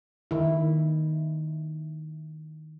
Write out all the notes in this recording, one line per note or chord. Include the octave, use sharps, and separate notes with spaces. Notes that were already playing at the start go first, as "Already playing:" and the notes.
D#3 E4